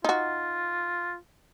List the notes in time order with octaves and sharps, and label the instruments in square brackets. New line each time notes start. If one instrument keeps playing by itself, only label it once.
[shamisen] D#4 F#4 [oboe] F4